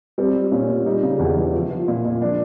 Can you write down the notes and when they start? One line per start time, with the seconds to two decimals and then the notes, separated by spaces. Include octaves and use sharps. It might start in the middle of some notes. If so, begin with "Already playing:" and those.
0.18 G3 C4
0.35 G3
0.52 A#2 C#4
0.68 A#2
0.85 G3 D#4
1.03 C#3
1.19 E2
1.37 E3
1.54 F3
1.71 F3
1.88 A#2
2.05 A#2
2.21 F3 D4